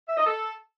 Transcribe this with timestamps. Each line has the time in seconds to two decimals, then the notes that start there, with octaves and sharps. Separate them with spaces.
0.08 E5
0.17 D#5
0.25 A4